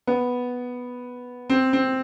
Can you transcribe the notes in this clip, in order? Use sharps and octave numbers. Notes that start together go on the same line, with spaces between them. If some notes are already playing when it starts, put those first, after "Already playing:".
B3
C4
C4